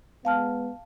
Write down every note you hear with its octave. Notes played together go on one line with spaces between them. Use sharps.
G#3 B3 F5 A5 F6